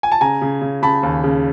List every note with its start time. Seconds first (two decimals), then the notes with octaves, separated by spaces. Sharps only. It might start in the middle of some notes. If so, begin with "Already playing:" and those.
0.03 G#5
0.12 A5
0.21 C#3 G#5 A#5
0.42 C#3
0.62 C#3
0.82 C#3 A5 B5
1.03 D#2
1.24 C#3